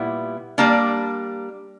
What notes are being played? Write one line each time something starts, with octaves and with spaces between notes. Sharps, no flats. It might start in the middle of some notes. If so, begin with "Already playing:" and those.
Already playing: A#2 G3 B3 E4
G3 A#3 D4